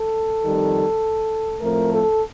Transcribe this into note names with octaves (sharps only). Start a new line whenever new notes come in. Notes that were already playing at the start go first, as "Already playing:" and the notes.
Already playing: A4
F2 D#3 G3
A2 F3 A3 C4 A#4
A4